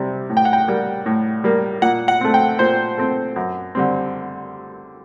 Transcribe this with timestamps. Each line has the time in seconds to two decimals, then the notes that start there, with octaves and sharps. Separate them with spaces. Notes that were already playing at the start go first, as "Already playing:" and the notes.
Already playing: C3 G3 C4
0.30 A2
0.37 G5
0.45 F#5
0.53 G5
0.68 G3 A#3
1.06 A2
1.44 G3 A#3
1.82 A#2 F#5
2.08 F#5
2.21 A3 C4
2.34 G5
2.59 A#2 C5
2.98 A3 C4
3.36 F#2
3.75 D3 G3 C4